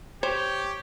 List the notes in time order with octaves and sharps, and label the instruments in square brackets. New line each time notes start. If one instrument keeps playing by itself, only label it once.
[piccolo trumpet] G4 [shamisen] C5 [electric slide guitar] C#5